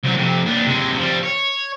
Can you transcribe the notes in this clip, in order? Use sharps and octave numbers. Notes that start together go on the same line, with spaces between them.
C2 F#3
F2 C3
D#2 D4
C3 G#3
F3 G3
C#5